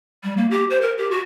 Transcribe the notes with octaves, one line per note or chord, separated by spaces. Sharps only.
G3
A#3
G4
C5
A#4
G4
F#4